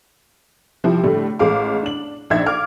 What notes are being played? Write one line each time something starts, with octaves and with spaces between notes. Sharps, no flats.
C3 F3 G3 E4
A2 D3 G3 A3
A1 G#3 F5 D6
D4 F#7
A#1 D4 D#4 E5 G#6
F5 D6 F6